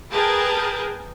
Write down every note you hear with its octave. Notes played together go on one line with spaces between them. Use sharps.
G#4 A#4 B4 G5 A5